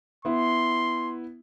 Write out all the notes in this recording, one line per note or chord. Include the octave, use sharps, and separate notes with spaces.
B3 E4 C6